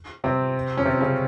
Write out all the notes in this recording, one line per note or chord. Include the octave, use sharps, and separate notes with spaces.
C3 C4
C#4
C3 C4
C#3 C#4